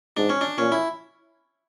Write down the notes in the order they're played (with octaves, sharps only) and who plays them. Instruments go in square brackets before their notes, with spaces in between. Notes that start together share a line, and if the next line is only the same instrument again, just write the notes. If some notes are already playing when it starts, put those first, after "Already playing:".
[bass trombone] G#2 [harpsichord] D4
[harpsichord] C#4
D4
[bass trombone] A#2 [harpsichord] C#4
[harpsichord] E4